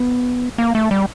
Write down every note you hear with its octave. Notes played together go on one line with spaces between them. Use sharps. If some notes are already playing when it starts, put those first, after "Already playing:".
Already playing: B3
A#3
A3
G3